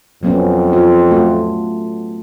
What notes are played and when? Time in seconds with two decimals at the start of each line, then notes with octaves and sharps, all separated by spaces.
0.23 F2 F#3 B3 C#4
0.73 F4
1.11 A3 F#4